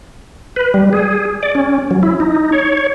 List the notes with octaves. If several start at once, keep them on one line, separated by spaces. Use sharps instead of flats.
B4
G3
G#4
D5
C#4
F#3
E4
D#4
C#5